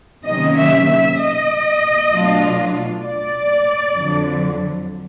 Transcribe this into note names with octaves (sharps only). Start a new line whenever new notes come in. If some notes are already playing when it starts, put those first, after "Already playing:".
C3 D#3 F#3 A#3 C#4 D#5
E5
E5
D#5
B2 F#3 A3 D4 F4
D5
F2 D3 F#3